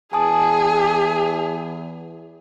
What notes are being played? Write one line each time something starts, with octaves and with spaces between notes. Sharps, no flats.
E2 G#4 G#5 A5 D#6